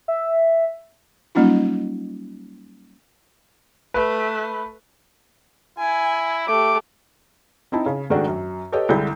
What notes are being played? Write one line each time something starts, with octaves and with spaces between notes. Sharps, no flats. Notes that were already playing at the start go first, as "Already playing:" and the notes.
E5
F#3 G3 A#3 C#4 D#4 F4
A3 B4
E4 G#5
A3 G4 D6
C4 D#4 E4 A5
C#3
G#2 D#3 G#3 A3 D4 F#4
F#2
G4 A4 B4 C#5 D#5 G5
C2 D3 G#3 D4 E4 G6